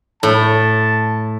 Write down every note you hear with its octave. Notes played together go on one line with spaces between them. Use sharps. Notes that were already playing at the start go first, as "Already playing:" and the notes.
A2 A5